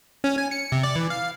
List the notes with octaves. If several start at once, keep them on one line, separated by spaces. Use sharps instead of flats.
C#4
G#5
C#7
C3
D5
E3
F5